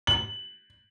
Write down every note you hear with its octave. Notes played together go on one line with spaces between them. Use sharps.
F#7